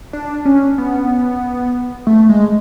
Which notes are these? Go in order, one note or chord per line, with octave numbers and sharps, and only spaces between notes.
D4
C#4
B3
A3
G#3